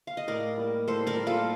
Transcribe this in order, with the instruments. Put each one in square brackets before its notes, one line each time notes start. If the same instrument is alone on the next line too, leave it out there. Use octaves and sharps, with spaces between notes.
[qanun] F5
D#5
[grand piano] A2 [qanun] A#4 D5
[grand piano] G3 A#3
[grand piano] A2 [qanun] A4 C5
[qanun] A#4 D5
[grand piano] G3 A#3
[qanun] F4 A4